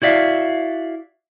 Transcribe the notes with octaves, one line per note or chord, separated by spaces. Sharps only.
E4 F#4 D5 E5 F5